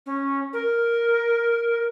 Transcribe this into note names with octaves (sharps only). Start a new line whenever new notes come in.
C#4
A#4